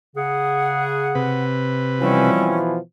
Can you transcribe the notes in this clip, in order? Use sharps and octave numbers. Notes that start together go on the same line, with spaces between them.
C#3 G#4 F#5
C3 B4
B2 E3 F3 G3 C4 C#4